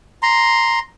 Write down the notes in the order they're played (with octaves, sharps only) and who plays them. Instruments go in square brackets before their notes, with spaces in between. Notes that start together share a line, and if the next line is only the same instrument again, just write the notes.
[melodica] A#5 C6